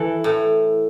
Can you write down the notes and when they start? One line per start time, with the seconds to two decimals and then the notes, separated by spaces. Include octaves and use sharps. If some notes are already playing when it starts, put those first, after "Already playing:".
Already playing: E3 A4
0.24 A2